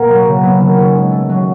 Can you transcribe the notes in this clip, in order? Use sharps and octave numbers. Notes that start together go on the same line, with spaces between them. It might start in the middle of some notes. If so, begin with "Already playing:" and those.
Already playing: B2 A#3
F#3
C#3
B3
D#3
C#4
G#3
A3
F#3